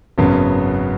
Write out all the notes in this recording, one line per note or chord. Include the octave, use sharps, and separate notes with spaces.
G#1 F#2 C#3 F#3 B3